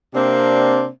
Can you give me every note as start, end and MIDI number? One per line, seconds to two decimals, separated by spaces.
0.14 0.87 48
0.14 0.87 58
0.14 0.87 60
0.14 0.87 62